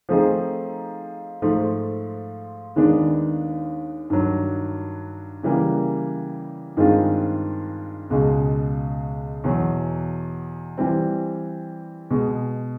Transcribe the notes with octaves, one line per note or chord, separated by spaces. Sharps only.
F3 A3 C4 D#4 G#4
G#2 F3 A3
D#2 D#3 G#3 B3 D4
G2 D#3 F#3
C#3 E3 G3 A#3
G2 D#3 G#3 C4 F4
C#2 B2 G#3
E2 B2 F#3
E3 G3 C4
B2 G#3 B3